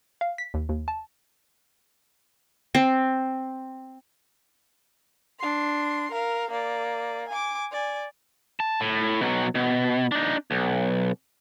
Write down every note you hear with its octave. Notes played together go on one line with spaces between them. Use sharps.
F5
B6
D#2
D#2
A5
C4
D4 C6
A#4 F5
A#3 D5
G#5 D6
D5 G#5
A5
A2
B2 F#3
B2
D4 D#4
B1